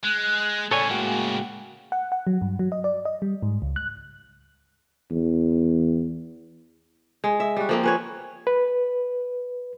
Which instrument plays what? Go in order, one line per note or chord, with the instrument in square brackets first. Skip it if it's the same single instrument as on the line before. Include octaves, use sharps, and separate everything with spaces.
[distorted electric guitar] G#3 [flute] F#6
[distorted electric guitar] A2 C#3 [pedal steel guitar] A4 C#5 G#5 [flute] D5
[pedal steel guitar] G#3 A#3 F#4 [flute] G5
[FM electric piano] F#5
F#5
F#3
G2
F#3
D#5
D5
D#5
G3
G#2
C#2
F#6
[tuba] E2
[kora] G#3
E5
G3 F#4
F3 A#3 C4
C#4 B4 C#5
[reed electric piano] B4